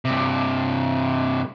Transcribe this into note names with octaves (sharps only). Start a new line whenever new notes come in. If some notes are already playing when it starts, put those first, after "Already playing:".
G2 C3